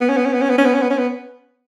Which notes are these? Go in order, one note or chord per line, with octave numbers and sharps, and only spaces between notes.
B3
C#4
B3
C#4
B3
C#4
B3
C#4
B3
C#4
B3
C#4
B3